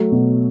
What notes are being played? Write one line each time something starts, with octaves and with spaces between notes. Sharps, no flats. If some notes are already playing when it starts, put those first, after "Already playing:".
Already playing: F#3 A3
B2